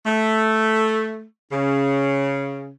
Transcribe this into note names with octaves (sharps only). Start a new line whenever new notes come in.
A3
C#3